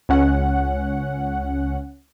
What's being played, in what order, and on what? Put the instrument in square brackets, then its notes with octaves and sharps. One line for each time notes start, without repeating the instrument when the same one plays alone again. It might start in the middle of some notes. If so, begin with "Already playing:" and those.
[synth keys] C#2 C#4 F#5